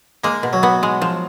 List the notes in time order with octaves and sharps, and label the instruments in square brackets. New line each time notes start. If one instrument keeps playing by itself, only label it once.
[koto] G#3 [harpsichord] A#3
[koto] B2
[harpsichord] F#3
[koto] B3
G#3
F3